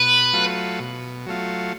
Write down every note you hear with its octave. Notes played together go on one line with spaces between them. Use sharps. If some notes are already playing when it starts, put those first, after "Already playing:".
Already playing: B2 B4
F#3 A3 F4
B2
F#3 A3 F4